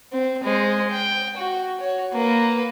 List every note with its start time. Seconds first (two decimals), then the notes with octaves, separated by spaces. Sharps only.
0.13 C4
0.44 G#3 C5
0.91 G5
1.37 F#4
1.81 F#4 C#5
2.13 A#3 B4